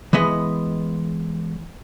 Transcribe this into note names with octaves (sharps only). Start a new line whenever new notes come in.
E3 G#3 B3 D#5